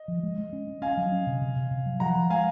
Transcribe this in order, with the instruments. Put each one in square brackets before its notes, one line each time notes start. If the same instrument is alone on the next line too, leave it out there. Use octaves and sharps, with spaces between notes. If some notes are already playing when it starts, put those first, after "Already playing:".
Already playing: [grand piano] D#5
[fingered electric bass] F3
G#3
G#3
C#4
C#4
[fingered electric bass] C#4 [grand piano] F5 G#5
[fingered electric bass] F#3
C#4
C3
C3
C3
C3
F#3
[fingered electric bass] F3 [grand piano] F#5 A#5
[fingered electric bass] F3
[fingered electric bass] G#3 [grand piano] F5 G#5